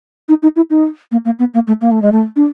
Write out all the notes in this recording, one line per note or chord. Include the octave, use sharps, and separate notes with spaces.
D#4
D#4
E4
D#4
A#3
A#3
B3
A#3
A3
A#3
A3
G#3
A3
D4